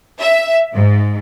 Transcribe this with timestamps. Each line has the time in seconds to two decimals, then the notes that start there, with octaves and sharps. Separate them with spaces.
0.20 E5
0.73 G#2